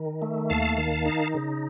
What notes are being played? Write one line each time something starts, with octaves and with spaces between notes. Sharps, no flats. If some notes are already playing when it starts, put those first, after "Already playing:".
Already playing: D#3
A3
D#2 F5 A5
D#3
D#4
C#3